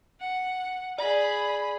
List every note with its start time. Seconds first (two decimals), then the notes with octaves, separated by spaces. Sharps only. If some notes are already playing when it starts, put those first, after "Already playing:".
0.19 F#5
0.98 G#4 D5 B5